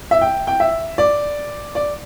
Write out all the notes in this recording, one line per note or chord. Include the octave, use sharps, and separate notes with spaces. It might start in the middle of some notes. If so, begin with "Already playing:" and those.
E5
G5
G5
E5
D5
D5